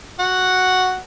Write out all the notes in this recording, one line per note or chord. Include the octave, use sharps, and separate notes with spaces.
F#4 F#5